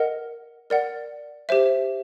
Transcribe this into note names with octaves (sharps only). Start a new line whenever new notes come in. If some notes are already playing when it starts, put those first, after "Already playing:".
Already playing: A#4 D#5 F#5
A#4 D5 F#5
G4 C5 E5